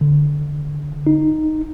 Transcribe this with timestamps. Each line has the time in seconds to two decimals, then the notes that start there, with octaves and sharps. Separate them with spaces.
0.01 D3
1.07 D#4